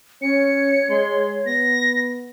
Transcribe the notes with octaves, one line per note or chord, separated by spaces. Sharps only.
C#4 C#5 C#7
G#3 C6
B3 A#6